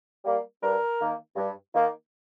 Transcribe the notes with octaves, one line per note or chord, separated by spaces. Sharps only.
G3 A#3
G2 A#4
D#3 A#3
G2
D#3 A#3